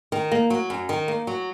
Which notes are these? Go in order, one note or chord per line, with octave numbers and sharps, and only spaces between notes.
D#3
A#3
F#3
F#2
D#3
A#3
F#3